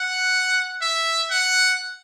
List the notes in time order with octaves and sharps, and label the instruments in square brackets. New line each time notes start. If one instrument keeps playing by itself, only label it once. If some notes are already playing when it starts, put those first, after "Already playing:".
Already playing: [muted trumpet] F#5
E5
F#5